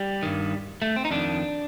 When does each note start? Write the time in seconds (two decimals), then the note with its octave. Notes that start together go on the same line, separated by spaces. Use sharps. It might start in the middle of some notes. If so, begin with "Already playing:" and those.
Already playing: G3
0.23 G2 D#3
0.82 A3
0.96 C4
1.05 D#4
1.11 F2 D#3 D4